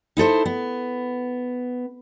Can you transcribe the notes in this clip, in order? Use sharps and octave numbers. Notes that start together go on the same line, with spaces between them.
D#4 E4 A4 C5
B3